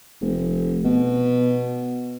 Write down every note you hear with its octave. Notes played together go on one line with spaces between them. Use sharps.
F1
B2